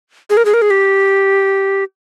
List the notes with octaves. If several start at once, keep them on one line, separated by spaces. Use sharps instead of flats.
G#4
A#4
G#4
A#4
G#4
G4